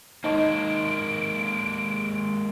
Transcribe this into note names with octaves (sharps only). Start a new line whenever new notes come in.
G#3 A#3 D#4 D#5 C#6 D7